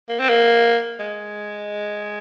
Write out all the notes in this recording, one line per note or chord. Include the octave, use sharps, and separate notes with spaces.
A#3
C4
A#3
G#3